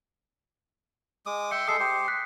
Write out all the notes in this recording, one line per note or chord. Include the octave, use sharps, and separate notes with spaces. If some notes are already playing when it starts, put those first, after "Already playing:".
G#3 D6 D#6
E5 G5 C6 C#7
G#3 A4 E5 D#6 C7
G4 C5
F#6 B6